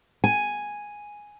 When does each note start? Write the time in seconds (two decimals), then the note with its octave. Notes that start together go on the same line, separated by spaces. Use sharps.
0.24 G#5